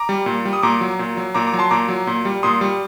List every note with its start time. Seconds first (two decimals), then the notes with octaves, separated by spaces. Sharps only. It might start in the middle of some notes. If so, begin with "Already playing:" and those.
Already playing: A#5 D6
0.09 G3
0.26 A#2
0.45 G3
0.53 D#6
0.63 A#2 A#5 D6
0.81 F#3
0.99 A#2
1.17 F#3
1.34 A#2 A#5 D6
1.47 A#5 D6
1.53 F#3
1.59 A5 C6
1.71 A#2 A#5 D6
1.89 F#3
2.07 A#2
2.25 G3
2.43 A#2 C6 D#6
2.61 G3